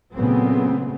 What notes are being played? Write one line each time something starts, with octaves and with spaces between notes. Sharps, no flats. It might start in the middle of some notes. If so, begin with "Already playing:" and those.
A#2 C#3 F#3 A3 B3 C4